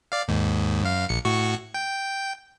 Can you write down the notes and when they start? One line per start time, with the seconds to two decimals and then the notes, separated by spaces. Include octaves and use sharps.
0.12 D5 F5
0.28 D#2 G#2
0.83 F#2 F5
1.09 A#1 C#7
1.25 A2 F#4 C#6
1.74 G5